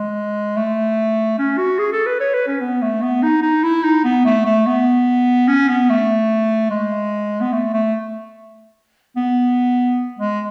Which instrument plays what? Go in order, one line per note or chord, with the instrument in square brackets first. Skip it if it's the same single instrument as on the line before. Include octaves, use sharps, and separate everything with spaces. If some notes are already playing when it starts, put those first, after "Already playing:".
Already playing: [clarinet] G#3
A3
C#4
F#4
G#4
A4
B4
C#5
B4
C#4
B3
A3
B3
D#4
D#4
E4
D#4
B3
A3
A3
B3
C#4
B3
A3
G#3
B3
A3
A3
B3
G#3